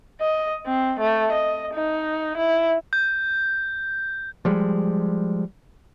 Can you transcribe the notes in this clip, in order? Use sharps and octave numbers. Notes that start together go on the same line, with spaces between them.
D#5
C4
A3
D#5
D#4
E4
G6
F3 G3 G#3